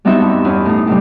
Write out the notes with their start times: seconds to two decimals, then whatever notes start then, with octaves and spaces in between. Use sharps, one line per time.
0.05 G3 B3 C4 D#4 F#4 E5
0.21 G2
0.45 E2 C#4 B4
0.65 A2 D#4
0.87 A2 C3 G3